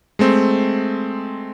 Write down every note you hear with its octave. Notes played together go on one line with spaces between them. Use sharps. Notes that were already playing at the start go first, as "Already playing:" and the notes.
G#3 A3 C4